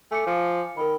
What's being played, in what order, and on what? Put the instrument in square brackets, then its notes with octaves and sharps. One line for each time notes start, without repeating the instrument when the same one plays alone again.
[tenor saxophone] A3 [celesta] G#5 D6 C#7
[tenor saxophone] F3
[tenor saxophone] D#3 [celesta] A#4 B5